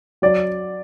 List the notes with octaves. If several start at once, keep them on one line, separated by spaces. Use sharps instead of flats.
F#3 D5